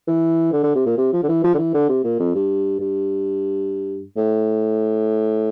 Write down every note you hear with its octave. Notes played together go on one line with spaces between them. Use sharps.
E3
D3
D3
C3
A#2
C3
F3
D3
E3
F3
D3
E3
D3
C3
A#2
F2
G2
G2
A2